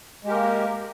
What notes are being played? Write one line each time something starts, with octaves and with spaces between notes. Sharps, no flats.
G#3 A#3 G4 A#4